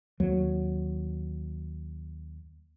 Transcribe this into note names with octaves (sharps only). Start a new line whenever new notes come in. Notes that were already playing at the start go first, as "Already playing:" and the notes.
D#2 F#3